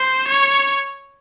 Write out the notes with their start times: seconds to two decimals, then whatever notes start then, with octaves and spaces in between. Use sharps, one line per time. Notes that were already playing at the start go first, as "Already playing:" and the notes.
Already playing: C5
0.28 C#5